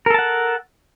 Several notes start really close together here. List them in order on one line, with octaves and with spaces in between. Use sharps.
A#4 A4 A5 F#5